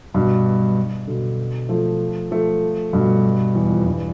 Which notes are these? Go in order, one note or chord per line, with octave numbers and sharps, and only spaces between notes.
G2 B2
B2 D3
F3 A3
F3 A3
G2 B2
E2
F2
E2 G2